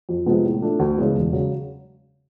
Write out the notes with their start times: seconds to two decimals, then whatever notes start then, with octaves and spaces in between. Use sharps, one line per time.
0.09 F2
0.26 C3 F3 G#3 B3
0.45 A2
0.62 F3 A3 D4
0.79 D2
0.97 C#3 E3 G#3 B3
1.15 E1
1.33 C#3 F#3